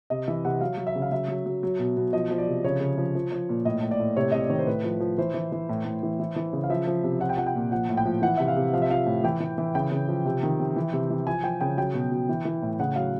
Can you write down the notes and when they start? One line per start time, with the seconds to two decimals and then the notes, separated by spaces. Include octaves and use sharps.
0.10 C3 D#5
0.28 E3 E5
0.45 C3 F#5
0.61 F#3 F5
0.77 F#3
0.87 E5
0.96 C#3
1.02 F5
1.12 F#3 E5
1.28 F#3
1.46 F#3
1.63 F#3
1.79 B2
1.97 B2
2.13 F3 D#5
2.31 F3
2.38 D5
2.48 C3
2.64 C#3 C#5
2.80 C#3
2.98 F3
3.15 F3
3.32 F3
3.49 A#2
3.65 A2 D#5
3.82 A2
3.91 D5
4.00 A2
4.16 C3 C#5
4.31 C3 D#5
4.41 D5
4.50 D#3 C#5
4.59 C5
4.67 A2 B4
4.84 F3
5.00 F3
5.18 E3 C5
5.34 E3
5.52 E3
5.69 A2
5.85 A2
6.03 E3
6.20 E3
6.36 E3
6.53 C#3
6.63 F5
6.70 F3 E5
6.87 F3
7.04 C3
7.20 F3 F#5
7.29 G5
7.37 F3 F#5
7.46 G5
7.55 A#2
7.71 F3 F#5
7.89 A2
7.97 G5
8.05 F3
8.22 E3 F#5
8.37 C3 E5
8.48 F5
8.56 C3
8.73 F3 F5
8.82 E5
8.90 F3 F5
9.06 A2
9.24 E3 G5
9.40 E3
9.58 E3
9.75 C#3 G5
9.92 C#3
10.08 F3
10.25 C3
10.43 D#3
10.60 C3
10.76 E3
10.93 C3
11.10 E3
11.27 F3 G#5
11.44 F3 G5
11.61 C#3 G5
11.77 F#3 G5
11.94 B2
12.12 F#3
12.29 E3
12.45 E3
12.62 A2
12.80 C#3 F#5
12.96 F#3 F5